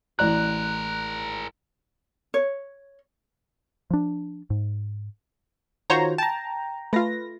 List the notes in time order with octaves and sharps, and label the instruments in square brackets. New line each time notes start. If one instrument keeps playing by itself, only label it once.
[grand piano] A1 D5 A#5 [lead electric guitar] G#4 A#4 [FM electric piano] F#6
[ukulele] C#5
[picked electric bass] F3 D4
G#2
[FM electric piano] D#3 F4 F#4 [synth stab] C5 C#5 A#5
[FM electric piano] G5 A#5 [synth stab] A5
[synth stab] A3 F4 [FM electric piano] B4 A#6